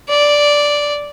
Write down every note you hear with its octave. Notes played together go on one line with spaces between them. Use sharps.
D5